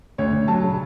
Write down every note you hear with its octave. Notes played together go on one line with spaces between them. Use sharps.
D2 C#5
D2
F#3 A5
C#3